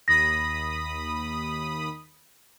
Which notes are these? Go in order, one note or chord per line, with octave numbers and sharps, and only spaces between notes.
D#2 B5 D#6 A#6